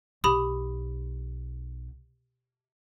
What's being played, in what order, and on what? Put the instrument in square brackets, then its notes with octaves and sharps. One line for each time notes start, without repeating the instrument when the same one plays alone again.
[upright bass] B1 [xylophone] G4 B5 D#6